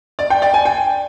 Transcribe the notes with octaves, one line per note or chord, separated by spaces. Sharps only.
D5
G5
D5
G#5
G5